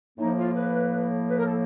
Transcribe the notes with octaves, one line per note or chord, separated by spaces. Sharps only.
A2 F3 A#3 D#4
F4
B4
B4
A#4
A4